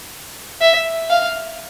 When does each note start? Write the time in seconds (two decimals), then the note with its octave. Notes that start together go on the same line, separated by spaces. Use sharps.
0.61 E5
1.10 F5